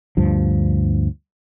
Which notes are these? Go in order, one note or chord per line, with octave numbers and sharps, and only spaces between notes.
D2 G2 F3